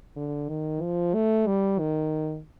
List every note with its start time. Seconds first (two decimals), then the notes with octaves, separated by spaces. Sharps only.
0.16 D3
0.49 D#3
0.82 F3
1.14 A3
1.47 G3
1.79 D#3